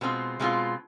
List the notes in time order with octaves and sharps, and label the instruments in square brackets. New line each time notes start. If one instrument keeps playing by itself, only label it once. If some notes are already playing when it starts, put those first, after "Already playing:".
[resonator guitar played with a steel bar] B2 G#3 C4 F4
B2 G#3 C4 F4